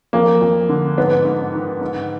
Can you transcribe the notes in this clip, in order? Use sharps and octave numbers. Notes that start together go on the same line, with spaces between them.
F2 A#3
F2
D3
G#2 B3
G#2
D#3
G#2